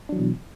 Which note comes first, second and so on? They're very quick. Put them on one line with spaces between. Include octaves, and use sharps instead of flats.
D4 F#3 E3 B2